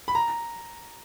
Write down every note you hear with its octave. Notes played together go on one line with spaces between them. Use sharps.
B5
A#5